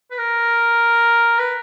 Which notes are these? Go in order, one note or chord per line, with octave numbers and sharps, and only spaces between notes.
B4
A#4
B4